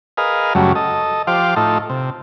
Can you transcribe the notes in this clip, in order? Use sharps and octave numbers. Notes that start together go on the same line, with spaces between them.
G#4 A#4 B4 D#5 F5
F#2 C#3 F#3 G3 A3
A4 D#5
F3 G4 C5 F5 D6
A2 D#4 F4 A4
C3